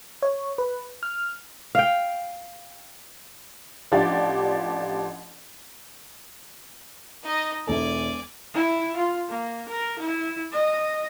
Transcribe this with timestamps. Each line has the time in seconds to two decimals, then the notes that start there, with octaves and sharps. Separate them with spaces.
0.22 C#5
0.58 B4
1.03 F6
1.75 F5 G5
3.92 A1 F3 D4 G4 D5 A6
7.23 D#4 D#5
7.67 E1 E4 A4 D5 G#5
8.54 E4
8.97 F4
9.29 A#3
9.69 A#4
9.99 E4
10.52 D#5